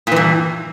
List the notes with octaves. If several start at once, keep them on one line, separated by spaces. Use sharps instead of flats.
G2 A#2 E3